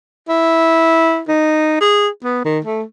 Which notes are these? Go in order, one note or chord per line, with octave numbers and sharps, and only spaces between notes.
E4
D#4
G#4
B3
D#3
A3